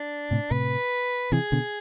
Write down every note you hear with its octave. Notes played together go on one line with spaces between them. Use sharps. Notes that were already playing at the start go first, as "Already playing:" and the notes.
Already playing: D4
A2 C3
A2 C3 B4
C3 E3 G#4
B2 D3